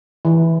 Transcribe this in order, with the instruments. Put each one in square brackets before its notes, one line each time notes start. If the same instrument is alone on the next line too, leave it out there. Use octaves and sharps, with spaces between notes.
[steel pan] E3